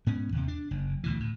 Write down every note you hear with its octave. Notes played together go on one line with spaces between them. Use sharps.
G#2 B3 C#4
D#2 C3
D4
F#1
D2 B2 E3
A2